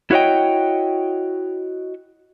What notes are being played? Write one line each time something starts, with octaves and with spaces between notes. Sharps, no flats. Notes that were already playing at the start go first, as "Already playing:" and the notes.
E4 F#4 C#5 D#5 G5